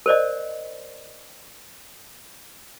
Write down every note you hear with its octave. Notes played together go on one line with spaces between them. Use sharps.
A#4 C5 D5 D#5